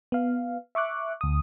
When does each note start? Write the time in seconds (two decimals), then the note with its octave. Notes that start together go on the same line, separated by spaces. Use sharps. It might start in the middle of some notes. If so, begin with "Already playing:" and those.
0.12 B3 F5
0.75 E5 C#6 D6 F#6
1.21 D2 D#6